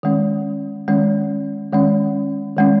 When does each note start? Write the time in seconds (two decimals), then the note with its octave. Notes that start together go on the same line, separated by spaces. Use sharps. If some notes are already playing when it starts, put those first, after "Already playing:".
0.03 D#3 G#3 C#4
0.88 D#3 G#3 C#4
1.72 D#3 G#3 C#4
2.57 D#3 G#3 C#4